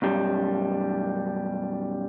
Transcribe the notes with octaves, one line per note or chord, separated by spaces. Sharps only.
B1 F#2 G3